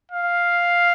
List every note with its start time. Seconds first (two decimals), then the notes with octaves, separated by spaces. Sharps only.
0.11 F5